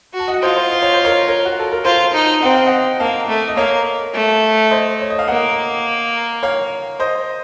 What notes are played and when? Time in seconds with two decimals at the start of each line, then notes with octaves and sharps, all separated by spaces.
0.13 F#4
0.19 A5
0.28 D#5 F#5
0.42 F4 C5 D#5
0.57 C5 D#5
0.71 D#5
0.83 C#5
0.94 C5
1.05 A#4 C#5
1.28 A#4 C#5
1.45 F#4
1.59 A4
1.72 A#4
1.85 F4 A4 C5
2.14 D#4
2.42 C4 F#5
2.54 F5
2.66 D#5 F#5
3.00 A#3 F5 A5
3.28 A3
3.48 D#5
3.56 A#3 C#5 F5
4.14 A3
4.71 C5 D#5
5.01 C#5
5.10 D#5
5.19 F5
5.28 A#3 D#5 F#5
6.43 C#5 F5
7.00 C5 D#5